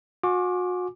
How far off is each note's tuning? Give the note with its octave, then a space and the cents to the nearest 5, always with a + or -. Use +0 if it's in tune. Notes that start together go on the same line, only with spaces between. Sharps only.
F#4 -40 G#5 +0 D6 +0